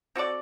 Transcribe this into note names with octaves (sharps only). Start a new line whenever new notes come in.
C4 F#4 A4 D5